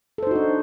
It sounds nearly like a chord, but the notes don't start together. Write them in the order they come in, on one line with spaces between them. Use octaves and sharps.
A4 C5 D#4 F#4 D4